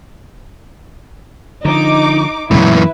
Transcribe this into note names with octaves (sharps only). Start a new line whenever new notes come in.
D3 F3 D#4 D6
F#2 A#2 E3 G#3 A3 E4 B4